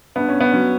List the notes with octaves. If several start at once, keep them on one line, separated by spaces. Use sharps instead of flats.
G2 B3
C#4
B3
F#3 C#4